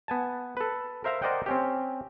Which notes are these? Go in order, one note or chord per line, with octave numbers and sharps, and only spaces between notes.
B3 G#5 A5
A4 B4
A#4 C5 E5 F5 A#5
A#4 C5 D5 D#5 F#5 G5
C4 C#4 G4